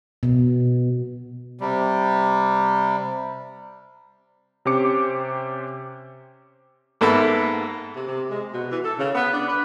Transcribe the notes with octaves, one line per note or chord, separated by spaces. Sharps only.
B2
C3 G3
C3 C#4 G4 C5 D6 C#7
G#2 A#3 B3 A4 E5 B5
C3
C3
G#3
B2
E3
A4
C#3
B3
D4
B4